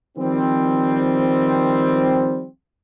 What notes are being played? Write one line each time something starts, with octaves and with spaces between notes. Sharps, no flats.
D#3 F3 G3 C4